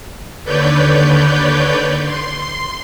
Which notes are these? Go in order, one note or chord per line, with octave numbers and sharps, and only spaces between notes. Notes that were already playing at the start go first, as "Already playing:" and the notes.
D#2 D3 B4 C#5 D5 G6
C6